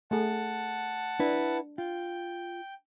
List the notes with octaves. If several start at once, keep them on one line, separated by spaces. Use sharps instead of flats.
A3 G#4 F#5 A5
D4 E4 B4
F4 G5